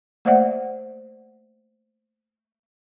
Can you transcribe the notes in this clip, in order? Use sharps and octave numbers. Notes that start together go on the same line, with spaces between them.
A3 A#3 C5 D5 E5 F#5